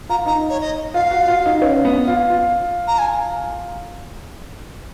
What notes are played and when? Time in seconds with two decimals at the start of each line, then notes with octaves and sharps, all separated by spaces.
0.09 F4 A#5
0.26 D#4 A#5
0.49 C#5
0.60 D#5
0.94 F4 F5
1.11 F#4
1.28 F4
1.46 D#4
1.62 C#4
1.85 B3
2.08 F4
2.30 F4
2.87 A#5
2.98 G#5